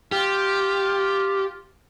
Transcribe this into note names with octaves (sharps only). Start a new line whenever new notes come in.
F4 G4